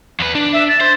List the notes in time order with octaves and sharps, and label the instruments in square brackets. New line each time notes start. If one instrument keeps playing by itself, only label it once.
[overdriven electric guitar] E2 B4
D4
[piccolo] E5
A6
[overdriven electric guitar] C5